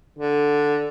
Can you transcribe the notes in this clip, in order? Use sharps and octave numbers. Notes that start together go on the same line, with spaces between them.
D3